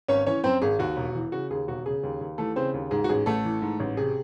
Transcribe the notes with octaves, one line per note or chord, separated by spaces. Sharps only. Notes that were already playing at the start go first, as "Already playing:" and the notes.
G#1 C#4 C#5
E3 C#4 C#5
F#2 C4 C5
G#1 G#4
D#2 F#4
E1
E3
C#3 F#4
D#2 G#4
E1 F#4
C#3 G#4
D#2
D#2
E3 A3 A4
C#3 C4 C5
D#2
G#2 G#4
F#4
A1 G#4
A1 A3 A4
E3
G#2
A1
C3 G#4